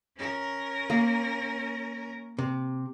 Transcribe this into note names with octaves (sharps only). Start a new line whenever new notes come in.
C#4 A#4
A#3
C3